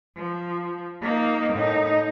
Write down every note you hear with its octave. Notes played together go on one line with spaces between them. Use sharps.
F3
A#3 D#4
A2 D#4